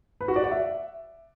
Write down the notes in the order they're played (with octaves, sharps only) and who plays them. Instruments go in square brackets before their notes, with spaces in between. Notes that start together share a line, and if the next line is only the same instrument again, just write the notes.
[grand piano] B4
F#4
D5
F#5
E5